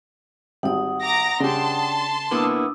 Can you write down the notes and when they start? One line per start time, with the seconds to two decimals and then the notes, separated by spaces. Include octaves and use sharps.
0.63 G#1 G3 F#5 G5 D#6
1.02 A#5 D6 A#6
1.40 C#3 D4 G4 A5 C6
2.31 A#3 B3 D4 E4 D#6 E6